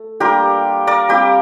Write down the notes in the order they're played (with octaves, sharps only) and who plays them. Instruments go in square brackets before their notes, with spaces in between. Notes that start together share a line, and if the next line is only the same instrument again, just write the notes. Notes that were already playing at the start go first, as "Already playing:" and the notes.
Already playing: [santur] A3
G3 A#3 D4 F4 G4 A#4
A#4 D5
G3 C4 F4 G4